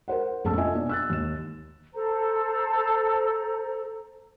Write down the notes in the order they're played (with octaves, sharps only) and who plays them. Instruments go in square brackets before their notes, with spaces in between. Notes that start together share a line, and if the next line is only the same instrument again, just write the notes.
[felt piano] A#4 C5 F#5
F1 A#1 C#4 A4 A5 E6
F4 D#5 E5 G#5
B2 D4
E6 F#6 A6
D#2 E7
[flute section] A4 C5 A#5